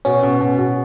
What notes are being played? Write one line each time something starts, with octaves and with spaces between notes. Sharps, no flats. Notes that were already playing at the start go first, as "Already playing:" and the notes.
B2 C#4
B2
B2
B2